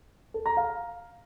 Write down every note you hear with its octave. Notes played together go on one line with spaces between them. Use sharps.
A4
A#5
F5